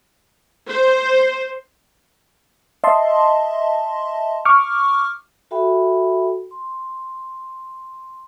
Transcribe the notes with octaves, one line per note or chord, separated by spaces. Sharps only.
C5
D#5 E5 A5 C6
C#6 D6 F6
F#4 A4 E5 G5 B5
C6